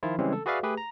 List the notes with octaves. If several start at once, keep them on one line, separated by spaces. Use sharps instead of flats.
D#3 F3 E4 F4
C#3 E3 G3 G#3 C4 C#4
A4
F#4 G#4 B4 D5 E5 F5
A3 G4 G#4 B4
A#5